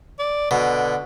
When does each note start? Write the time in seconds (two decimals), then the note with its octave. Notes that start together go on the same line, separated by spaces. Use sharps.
0.19 D5
0.51 B2 D3